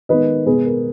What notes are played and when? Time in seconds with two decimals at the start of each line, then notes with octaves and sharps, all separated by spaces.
0.09 D#3 G#3 B3 B4 D#5
0.46 B2 G#3 B3 G#4 B4
0.65 A#4